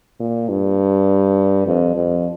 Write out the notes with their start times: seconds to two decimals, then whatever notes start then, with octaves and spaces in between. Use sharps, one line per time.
0.20 A#2
0.49 G2
1.66 F2
1.96 F2